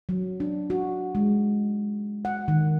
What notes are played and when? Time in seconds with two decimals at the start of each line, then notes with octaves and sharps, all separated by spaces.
0.09 F#3
0.40 D4
0.70 F#4
1.15 G#3
2.25 F#5
2.48 D#3